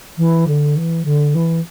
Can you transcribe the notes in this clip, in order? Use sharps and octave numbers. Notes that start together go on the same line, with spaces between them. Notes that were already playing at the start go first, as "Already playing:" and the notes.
E3
D3
E3
D3
E3